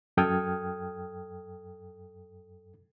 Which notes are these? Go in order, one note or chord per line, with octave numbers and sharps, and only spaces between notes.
F#2 A4 G5 D#6 F6 G#6